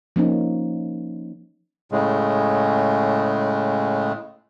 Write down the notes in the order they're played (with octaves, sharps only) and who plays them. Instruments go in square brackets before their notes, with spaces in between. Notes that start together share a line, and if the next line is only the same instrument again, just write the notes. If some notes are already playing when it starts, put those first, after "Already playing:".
[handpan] F3 A#3 C#4 D#4
[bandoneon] A2 C#3 G#3